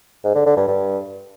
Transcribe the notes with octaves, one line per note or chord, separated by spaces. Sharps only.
G#2
D3
D3
G2
G2